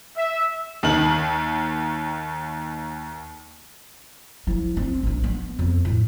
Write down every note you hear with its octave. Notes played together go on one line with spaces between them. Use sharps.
E5
D#2 D#3 F#7
F3 E4
C4
A#1 F3
B3
F2
A2